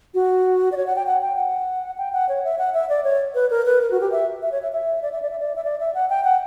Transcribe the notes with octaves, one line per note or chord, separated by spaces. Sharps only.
F#4
D5
C#5
F#5
G5
F#5
G5
F#5
G5
F#5
C#5
E5
F#5
E5
D5
C#5
B4
A#4
B4
A#4
F#4
G4
E5
E5
C#5
E5
E5
D5
E5
D5
E5
D5
E5
D5
E5
F#5
G5
F#5